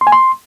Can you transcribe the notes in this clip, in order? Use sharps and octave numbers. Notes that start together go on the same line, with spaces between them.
C6
G#5
C6